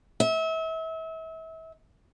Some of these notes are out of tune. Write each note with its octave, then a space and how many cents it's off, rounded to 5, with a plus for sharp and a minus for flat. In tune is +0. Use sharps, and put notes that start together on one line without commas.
E5 -35